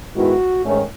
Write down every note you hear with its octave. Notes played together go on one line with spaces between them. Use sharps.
G#2 D#3 G#3 B3 E4 F#4
G#2 D#3 A3 C#4